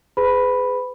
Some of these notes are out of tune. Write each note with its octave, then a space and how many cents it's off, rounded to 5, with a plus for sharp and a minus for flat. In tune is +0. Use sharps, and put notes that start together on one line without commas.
G#4 +0 B4 +35 B5 +0